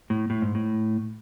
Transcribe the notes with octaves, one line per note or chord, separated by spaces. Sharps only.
A2
A2
G#2
A2